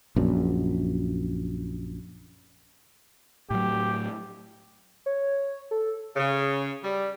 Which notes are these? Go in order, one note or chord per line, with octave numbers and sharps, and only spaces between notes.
A#1 F#2
A2 F#3 G4
C#5
A4
C#3
G3